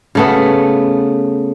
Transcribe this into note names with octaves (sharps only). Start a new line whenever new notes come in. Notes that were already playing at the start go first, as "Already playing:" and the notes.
C#3 A3 B3